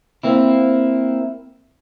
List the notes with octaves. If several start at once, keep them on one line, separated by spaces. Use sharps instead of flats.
A#3 C4 E4